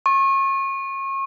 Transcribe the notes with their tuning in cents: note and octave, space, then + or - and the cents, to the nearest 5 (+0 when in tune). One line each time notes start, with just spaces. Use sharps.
C#6 -35